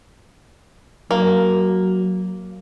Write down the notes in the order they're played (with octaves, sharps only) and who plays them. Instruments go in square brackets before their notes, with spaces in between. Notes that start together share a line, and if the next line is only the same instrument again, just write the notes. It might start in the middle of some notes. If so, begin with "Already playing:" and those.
[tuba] F#3 [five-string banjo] A#3